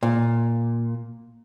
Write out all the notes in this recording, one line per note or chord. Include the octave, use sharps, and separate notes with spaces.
A#2